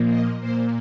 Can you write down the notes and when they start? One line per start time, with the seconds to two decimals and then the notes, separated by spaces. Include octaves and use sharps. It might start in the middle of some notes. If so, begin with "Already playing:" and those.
Already playing: A#2 F3 A#3
0.09 D#5
0.40 A#2 A#3 C5